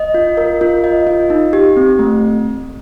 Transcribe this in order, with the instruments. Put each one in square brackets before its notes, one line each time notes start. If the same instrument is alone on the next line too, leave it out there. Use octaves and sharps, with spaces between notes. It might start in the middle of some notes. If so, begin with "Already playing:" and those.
Already playing: [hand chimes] D#5
F4
A#4
F4
D#5
F4
D#4
G4
C4
A3